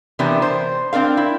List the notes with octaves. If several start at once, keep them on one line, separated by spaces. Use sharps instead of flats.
C3 E3 B3 D4 G4 A#4
C5
C4 D4 A#4 F5
E4